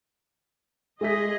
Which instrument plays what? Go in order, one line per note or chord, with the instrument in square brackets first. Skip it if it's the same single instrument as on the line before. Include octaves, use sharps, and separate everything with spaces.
[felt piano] G#3 E5 B6 [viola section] G#4 D#5